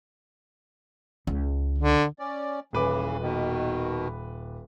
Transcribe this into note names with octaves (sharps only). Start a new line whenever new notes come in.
C#2
D3
C#4 D5
D#1 C#3 E3 B4 D6
B2 D#3